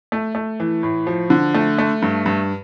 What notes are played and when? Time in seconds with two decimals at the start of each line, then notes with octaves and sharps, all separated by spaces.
0.12 A3
0.35 A3
0.60 E3
0.83 A2
1.07 F3
1.30 D3
1.55 A3
1.79 A3
2.02 G2
2.26 G2